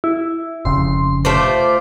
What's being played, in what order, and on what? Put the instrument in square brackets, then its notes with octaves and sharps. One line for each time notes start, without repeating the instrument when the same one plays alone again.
[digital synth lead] E4
[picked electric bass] F1 C#3 [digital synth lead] C6
[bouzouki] A3 F4 C5 [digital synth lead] D6